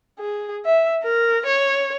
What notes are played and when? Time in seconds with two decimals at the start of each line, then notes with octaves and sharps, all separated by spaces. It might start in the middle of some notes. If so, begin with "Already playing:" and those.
0.20 G#4
0.65 E5
1.03 A#4
1.46 C#5